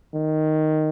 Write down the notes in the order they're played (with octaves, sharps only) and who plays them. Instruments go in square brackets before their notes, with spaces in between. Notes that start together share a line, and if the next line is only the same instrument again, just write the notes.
[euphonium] D#3